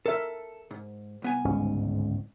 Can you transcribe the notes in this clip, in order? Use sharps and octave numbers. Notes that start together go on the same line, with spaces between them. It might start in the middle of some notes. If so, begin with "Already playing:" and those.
A4 A#4 E5
G#2
C2 B3 G#5
G1 C#2 G#2 C#4